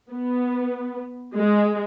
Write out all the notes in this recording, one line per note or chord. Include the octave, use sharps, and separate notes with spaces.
B3
G#3